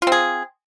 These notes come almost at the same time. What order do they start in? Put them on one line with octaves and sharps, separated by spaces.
F4 C4 G#4